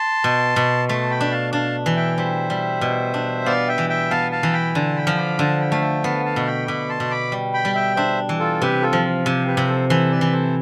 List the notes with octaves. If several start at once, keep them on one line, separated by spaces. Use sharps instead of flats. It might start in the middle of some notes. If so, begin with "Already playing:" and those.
Already playing: A5 C6
B2
B2
A3 A5 C6
G5 B5
D4
F5 A5
D4 F5 A5
E3
E5 G5
G3 C5 E5
G3
B2
D4
B3 D5 F5
E5 G5
E3
E5 G5
B3 F5 A5
F5 A5
E3
G5 B5
D3 A5 C6
G5 B5
F3
B5 D6
D3 A5 C6
G5 B5
A3 F5
E5 G5
B3 F5 A5
F5 A5
B2
G5 B5
B2 B5 D6
A5 C6
B2
B5 D6
G3
G5 B5
G3
E5 G5
D4 C5 E5
E3
F4 A4
C3 G4 B4
F4 A4
F3
F4
C3 G4
G4 B4
C3
A4 C5
E3 A4 C5
B4 D5
E3
A4 C5